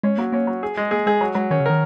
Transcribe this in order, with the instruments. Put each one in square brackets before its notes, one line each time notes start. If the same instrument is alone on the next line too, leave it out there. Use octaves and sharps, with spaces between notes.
[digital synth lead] G#3 [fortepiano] C#4
[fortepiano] F#3 [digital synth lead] A#3
[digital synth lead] A#3 [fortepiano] C#4
[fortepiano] F#3
G#4
G#3
[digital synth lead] A#3 [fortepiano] G#4
[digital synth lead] G#3 [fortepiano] G#4
[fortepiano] F#3
[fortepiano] F#3 [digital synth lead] G#3
[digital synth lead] D#3 [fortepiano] C#4
[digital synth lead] C#3
[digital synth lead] D#3 [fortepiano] A#4